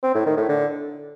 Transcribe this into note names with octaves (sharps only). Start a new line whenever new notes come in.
C4
A2
D#3
A2
D3